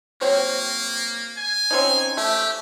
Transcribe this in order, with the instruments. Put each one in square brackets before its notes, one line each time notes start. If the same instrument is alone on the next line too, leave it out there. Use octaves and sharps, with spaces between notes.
[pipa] F#3 C4 C#5 [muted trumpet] A#3
[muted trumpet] G#5
[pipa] C4 C#4 D#4
[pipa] A3 [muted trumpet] G4